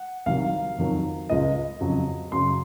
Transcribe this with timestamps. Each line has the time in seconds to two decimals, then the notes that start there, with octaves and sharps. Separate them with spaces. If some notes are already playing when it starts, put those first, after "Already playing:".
Already playing: F#5
0.26 C2 C3 D#3 F#3 F5
0.78 F2 D#3 F#3
1.29 C#2 C#3 F3 D#5
1.81 F2 C#3 F#3
2.32 F#2 C#3 F#3 C6